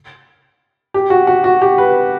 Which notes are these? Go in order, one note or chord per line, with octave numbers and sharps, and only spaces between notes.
G4
F#4
F#4
F#4
G4
B4